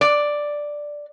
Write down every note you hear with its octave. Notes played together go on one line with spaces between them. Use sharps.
D5